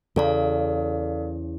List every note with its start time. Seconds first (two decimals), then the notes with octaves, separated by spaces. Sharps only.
0.16 E2 C#3 A4 D5 F5